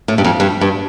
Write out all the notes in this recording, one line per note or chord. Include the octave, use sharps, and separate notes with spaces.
A2
G2
F2
G2
G2